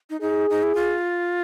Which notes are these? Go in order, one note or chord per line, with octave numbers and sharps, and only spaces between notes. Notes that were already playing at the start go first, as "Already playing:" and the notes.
D#4
D#4 G#4
D#4
E4
F4